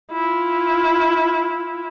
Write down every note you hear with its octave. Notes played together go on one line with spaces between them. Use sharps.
E4 F4